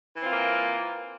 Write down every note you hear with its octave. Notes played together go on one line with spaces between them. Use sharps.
E3 A#3 C4 F4